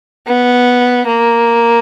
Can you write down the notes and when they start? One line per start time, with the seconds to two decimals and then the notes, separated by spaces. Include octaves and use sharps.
0.27 B3
1.07 A#3